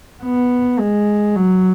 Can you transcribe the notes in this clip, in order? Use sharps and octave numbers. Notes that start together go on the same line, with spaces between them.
B3
G#3
F#3